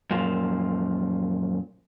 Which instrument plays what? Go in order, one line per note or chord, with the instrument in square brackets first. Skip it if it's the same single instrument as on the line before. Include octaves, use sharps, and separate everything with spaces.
[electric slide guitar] F#2 A#2 F3